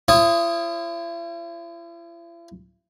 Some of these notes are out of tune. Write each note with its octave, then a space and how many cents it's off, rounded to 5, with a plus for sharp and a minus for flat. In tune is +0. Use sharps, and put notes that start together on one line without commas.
E4 +45 C#5 -30 D#6 +0